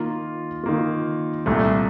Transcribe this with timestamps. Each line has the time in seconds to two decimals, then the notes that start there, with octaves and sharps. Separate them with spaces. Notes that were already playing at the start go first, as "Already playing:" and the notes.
Already playing: D#3 A#3 F4
0.64 D#3 A#3 F4
1.46 C2 A#2 A3